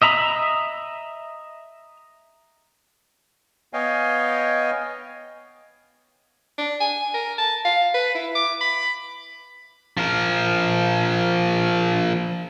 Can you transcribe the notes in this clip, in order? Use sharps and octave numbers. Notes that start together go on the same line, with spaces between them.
D#5 E5 A#5 B5
B3 C#5 D#5 F5 G5 G#5
D4
G#5
A#4
A5
F5
B4
E4
D6
B5
F3 A#4